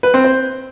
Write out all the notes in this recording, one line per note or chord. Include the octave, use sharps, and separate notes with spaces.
B4
C4
C5